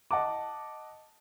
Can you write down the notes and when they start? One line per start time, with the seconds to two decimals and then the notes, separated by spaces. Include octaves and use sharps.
0.11 D#5 F#5 A5 D6